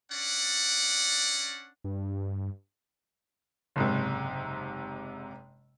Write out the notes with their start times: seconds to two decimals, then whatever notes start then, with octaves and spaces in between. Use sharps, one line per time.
0.11 C#4 D4 D5 F#5
1.84 G2
3.76 F#1 G#2 C3